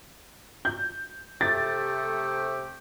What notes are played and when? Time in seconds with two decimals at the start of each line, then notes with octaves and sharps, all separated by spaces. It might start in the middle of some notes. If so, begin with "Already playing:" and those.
0.65 G6
1.41 C3 A3 G4 A6